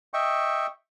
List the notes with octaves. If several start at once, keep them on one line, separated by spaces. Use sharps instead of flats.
D#5 E5 G5 C#6